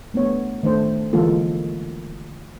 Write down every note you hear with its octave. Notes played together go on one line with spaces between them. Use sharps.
A3 B3 D4 C#5
D#3 A3 D4 C5
D3 E3 G#3 A#3 F4 A4